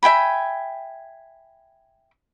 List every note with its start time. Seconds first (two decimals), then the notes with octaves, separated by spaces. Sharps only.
0.03 E5 G5 G#5 B5